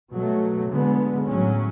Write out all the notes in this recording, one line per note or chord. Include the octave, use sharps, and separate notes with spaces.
B2 F#3 A3
D3 G#3 B3
A2 F#3 C#4